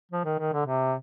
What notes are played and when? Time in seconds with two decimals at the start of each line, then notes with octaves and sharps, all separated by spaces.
0.12 F3
0.25 D#3
0.39 D#3
0.53 D3
0.66 C3